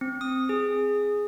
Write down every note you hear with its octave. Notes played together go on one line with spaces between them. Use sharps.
C4
D#6
G#4